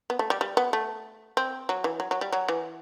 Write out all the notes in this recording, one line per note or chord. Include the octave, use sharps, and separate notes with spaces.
B3
A3
G3
G3
B3
A3
C4
F#3
E3
F#3
F#3
G3
F#3
E3